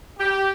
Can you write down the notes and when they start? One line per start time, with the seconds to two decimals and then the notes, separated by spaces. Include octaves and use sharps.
0.18 G4